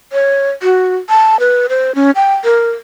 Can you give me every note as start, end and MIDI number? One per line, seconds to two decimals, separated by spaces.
0.12 0.50 73
0.63 0.96 66
1.09 1.39 81
1.40 1.67 71
1.69 1.94 72
1.95 2.11 61
2.15 2.34 79
2.44 2.71 70